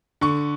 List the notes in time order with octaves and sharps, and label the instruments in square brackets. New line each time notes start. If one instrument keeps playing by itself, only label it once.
[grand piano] D3 C#6